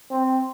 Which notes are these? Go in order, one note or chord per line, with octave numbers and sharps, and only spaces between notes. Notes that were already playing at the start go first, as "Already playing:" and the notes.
C4